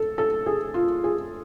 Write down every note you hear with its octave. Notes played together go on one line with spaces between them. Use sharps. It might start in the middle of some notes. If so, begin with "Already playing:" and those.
Already playing: A4
A4
G#4
F4
G#4